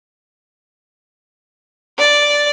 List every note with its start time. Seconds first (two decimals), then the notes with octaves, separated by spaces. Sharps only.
1.98 D5